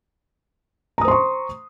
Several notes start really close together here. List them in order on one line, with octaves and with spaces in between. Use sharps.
A#5 D#6 C5 C6 C#6